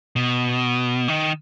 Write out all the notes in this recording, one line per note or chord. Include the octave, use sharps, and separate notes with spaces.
B2
D#3